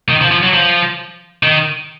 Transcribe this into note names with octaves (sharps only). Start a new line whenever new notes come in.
D#3
F3
F3
F#3
F3
D#3